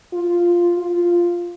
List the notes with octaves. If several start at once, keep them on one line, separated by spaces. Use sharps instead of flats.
F4
F4